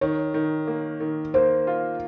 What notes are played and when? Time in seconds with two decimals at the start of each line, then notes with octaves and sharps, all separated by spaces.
0.01 D#3 C#5
0.34 D#3
0.68 A#3
1.00 D#3
1.34 A#3 C5
1.67 F4